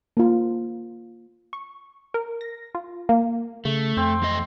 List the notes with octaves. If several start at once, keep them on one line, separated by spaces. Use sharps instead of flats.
A#3 F4
C#6
A#4
A#6
F4
A#3
C#3 A3
F2 C4
E2 A3 D#5